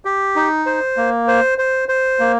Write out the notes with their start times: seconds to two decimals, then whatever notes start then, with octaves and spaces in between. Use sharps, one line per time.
0.05 G4
0.36 D#4
0.66 C5
0.97 A#3
1.28 C5
1.58 C5
1.89 C5
2.19 A#3